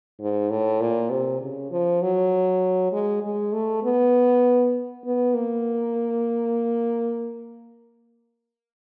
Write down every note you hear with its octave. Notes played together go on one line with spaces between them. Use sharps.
G#2
A2
A#2
C3
C#3
F3
F#3
G#3
G#3
A3
B3
B3
A#3